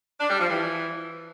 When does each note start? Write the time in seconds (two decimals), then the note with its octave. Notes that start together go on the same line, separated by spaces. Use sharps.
0.20 D4
0.30 G3
0.40 F3
0.49 E3